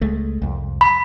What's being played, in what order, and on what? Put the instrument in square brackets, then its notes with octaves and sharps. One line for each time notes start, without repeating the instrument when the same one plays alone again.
[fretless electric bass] C#2 G#3 A3
C2 F2
[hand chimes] B5